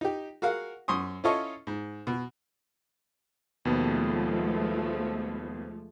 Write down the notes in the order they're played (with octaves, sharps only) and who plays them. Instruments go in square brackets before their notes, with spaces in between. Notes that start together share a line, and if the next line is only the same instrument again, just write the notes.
[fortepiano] D#4 G4
F#4 G#4 A#4 F5 F#5
F#2 C6 C#6 D#6
C#4 E4 F4 A4 C#5 D#5
G#2
B2
[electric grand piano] D#2 B2 B3 [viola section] F3 G#3 A3